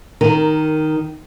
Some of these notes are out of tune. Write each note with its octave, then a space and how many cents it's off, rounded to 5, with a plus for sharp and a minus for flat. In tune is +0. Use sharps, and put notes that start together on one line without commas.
D#3 +0 D#4 +0 A#4 -15